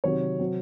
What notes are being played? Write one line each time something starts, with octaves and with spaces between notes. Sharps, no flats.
C3 D#3 F#3 C4 C#5
C3 F#3 C4